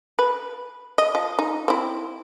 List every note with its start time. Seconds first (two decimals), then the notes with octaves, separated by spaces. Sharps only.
0.19 B4
0.98 D#5
1.15 F3
1.39 D#4
1.68 C4 E4